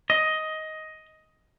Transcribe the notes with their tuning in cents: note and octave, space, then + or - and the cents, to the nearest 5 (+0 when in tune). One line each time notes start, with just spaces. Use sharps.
D#5 +10